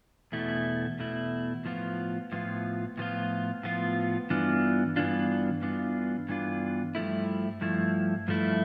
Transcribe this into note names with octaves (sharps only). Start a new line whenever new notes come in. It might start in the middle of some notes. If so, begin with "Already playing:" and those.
E2 B2 A3 E4
E2 B2 A3 E4
A2 F3 B3 F4
A2 F3 B3 F4
A2 F3 B3 F4
A2 F3 B3 F4
G2 E3 B3 D4 F4
G2 E3 B3 D4 F4
G2 E3 B3 D4 F4
G2 E3 B3 D4 F4
G2 F3 A3 E4
G2 F3 A3 E4
G2 F3 A3 E4